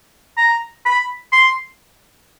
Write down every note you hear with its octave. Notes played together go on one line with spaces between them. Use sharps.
A#5
B5
C6